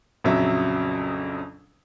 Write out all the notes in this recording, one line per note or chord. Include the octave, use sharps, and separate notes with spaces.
A#1 F2 C#3 F#3 E5